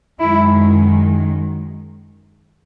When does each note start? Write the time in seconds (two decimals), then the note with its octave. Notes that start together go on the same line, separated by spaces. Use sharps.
0.20 F#2 D#3 G#3 E4